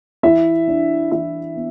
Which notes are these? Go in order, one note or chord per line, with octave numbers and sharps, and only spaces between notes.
E3 E4 E5
D4
E3 E4 E5
B3